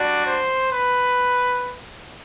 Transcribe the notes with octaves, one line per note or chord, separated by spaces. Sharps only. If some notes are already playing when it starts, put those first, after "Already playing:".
Already playing: G3 D4 F#4 D5
C5
B4